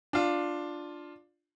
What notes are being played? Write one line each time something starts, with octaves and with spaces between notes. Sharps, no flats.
D4 F4